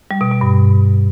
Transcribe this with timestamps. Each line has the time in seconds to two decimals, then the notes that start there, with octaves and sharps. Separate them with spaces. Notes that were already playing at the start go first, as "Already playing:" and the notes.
0.11 G3
0.21 B2
0.31 B2
0.41 G2